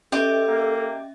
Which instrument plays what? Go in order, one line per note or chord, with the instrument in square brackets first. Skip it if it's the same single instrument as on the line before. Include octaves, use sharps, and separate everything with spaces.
[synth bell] C#4 D#5 E5 [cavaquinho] G4 [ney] A4
[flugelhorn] A#3